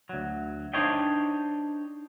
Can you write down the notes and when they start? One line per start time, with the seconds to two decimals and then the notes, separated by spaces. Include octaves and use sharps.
0.09 D2 F#3
0.74 D4 D#4 C5 C#5 D#5 G5